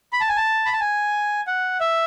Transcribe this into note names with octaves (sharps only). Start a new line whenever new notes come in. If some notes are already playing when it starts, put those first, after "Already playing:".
B5
A5
G#5
A5
B5
A5
G#5
F#5
E5